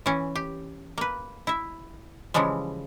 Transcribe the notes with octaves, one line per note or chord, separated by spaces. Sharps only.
E3 C#4
G4
A#3 B4
E4 E5
C#3 E3 F3 G3 G#3